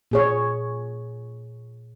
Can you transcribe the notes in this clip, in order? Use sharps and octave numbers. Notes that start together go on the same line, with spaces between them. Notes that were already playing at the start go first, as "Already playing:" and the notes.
A#2 G#4 C#5